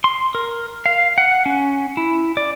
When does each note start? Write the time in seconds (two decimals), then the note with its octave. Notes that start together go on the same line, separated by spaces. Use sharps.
0.04 C6
0.35 A#4
0.86 F5
1.18 F#5
1.46 C#4
1.97 E4
2.37 D5